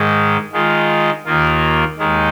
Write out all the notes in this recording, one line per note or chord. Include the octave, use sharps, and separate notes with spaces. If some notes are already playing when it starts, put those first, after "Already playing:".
Already playing: G#2 D#3 G#3
D#3 G#3 F4
D#2 D#3 A#3 F4
D#2 D#3 G#3 D#4